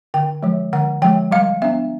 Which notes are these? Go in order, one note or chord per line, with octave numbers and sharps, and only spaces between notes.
D3 G5
F3 G#3
D3 F#5
F3 G#3 G5
G3 F5
B3 D4 E5